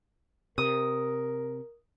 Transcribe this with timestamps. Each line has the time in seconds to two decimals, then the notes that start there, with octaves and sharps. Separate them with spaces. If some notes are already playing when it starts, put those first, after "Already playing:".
0.58 C3 A#4 D#6